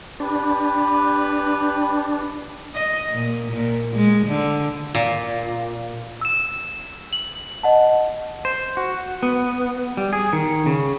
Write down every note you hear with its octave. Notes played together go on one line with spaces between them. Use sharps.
D4 G4 B4
D#5
A#2
A#2
G#3
D3
A#2
E6 E7
F#7
D#5 F#5 A5
C5
F#4
B3
G3
G#4
D#3
C#3